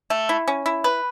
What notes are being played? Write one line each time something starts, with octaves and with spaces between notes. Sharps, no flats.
A3
E4
C#4
E4
B4